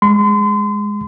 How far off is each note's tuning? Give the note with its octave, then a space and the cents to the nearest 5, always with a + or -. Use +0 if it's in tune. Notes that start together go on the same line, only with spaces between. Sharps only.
G#3 -10 C6 -35